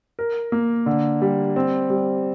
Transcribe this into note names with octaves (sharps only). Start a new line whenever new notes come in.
A#4
A#3
D3
G3
C4
G3